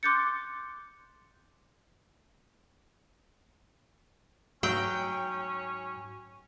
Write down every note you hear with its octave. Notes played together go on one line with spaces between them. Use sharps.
C6 D6 F#6 G6 A6 C#7
G#2 F#3 C#4 G5